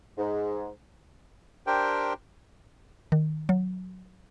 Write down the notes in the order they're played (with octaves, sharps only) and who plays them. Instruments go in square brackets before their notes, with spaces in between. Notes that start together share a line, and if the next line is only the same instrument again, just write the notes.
[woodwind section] G#2
[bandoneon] D4 G4 A#4 C5 G5
[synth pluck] D#3
F#3